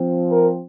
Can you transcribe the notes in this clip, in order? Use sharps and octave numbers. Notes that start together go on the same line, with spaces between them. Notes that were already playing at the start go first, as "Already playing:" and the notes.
Already playing: F3 C4
A#4